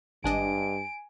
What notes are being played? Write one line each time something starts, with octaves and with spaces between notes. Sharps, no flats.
G#1 G2 D4 D#5 G#5 D7